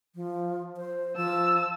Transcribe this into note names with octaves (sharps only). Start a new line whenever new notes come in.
F3
C5
F3 A5 E6